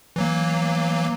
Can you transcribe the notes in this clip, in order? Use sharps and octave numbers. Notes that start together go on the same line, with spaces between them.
E3 F#3 A#3